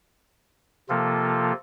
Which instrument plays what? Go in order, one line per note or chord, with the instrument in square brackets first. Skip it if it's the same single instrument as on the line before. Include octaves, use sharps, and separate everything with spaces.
[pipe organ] C3 F3 A#3 F4 A4